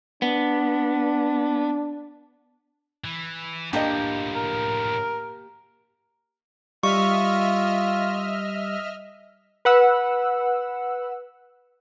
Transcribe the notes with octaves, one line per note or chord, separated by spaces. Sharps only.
B3 D4
E3
A2 F3 A#3 D4 G4 D#5
A#4
G3 F4 D#5 E5 C#6 F6
B4 F#5 E6